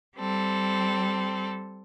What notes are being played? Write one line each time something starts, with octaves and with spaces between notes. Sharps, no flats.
G3 C4 A4